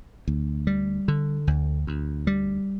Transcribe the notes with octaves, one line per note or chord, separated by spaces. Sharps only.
D2
G3
D3
D2
D2
G3